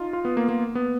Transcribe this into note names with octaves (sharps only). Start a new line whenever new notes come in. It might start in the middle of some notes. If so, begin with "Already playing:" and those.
Already playing: D#4 F4
F4
B3
A#3
A#3
B3